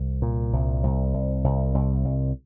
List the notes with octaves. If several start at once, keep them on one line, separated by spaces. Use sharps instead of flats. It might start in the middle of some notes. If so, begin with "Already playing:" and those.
Already playing: C2
A#2
C2
C2
C2
C2
C2
C2